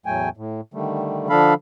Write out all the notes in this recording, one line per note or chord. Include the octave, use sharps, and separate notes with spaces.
E2 A2 F#3 A3 G5 G#5
A2
D3 D#3 G3 A3
D3 F3 D4 A4 F5 B5